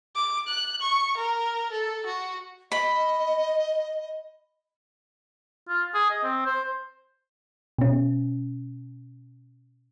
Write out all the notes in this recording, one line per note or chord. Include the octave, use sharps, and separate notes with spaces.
D6
F#6
C#6
A#4
A4
F#4
D#5 B5
F4
G#4
D#5
C4
C5
B2 C#4